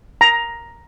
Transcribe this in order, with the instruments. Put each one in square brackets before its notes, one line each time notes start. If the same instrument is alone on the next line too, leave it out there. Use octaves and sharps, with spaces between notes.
[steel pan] A#5